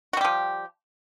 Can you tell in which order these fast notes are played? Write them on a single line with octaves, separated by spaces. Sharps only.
F#4 G3 G4 F3